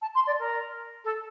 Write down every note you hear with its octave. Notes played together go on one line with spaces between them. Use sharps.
A5
C6
D5
A#4
A4